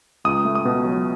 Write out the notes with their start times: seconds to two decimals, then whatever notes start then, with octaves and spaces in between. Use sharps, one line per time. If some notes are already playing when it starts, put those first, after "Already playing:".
0.24 C#2 D#6
0.45 A3
0.55 D#6
0.65 B2
0.85 F#3